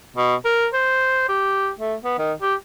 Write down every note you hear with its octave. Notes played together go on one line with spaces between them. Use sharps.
B2
A#4
C5
G4
A3
B3
D#3
G4